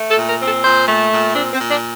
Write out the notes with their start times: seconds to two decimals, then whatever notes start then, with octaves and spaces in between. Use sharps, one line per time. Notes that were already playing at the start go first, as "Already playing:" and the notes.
Already playing: A3
0.10 A4
0.16 A#2
0.29 A#4
0.40 C4
0.46 A4
0.63 A#2 C5
0.87 A3
1.12 A#2
1.35 C4 D4
1.53 C4
1.58 A#2
1.70 D4